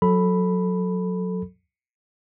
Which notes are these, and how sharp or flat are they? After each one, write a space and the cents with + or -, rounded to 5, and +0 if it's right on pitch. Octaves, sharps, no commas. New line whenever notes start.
F#3 -25 A4 +0 B5 +0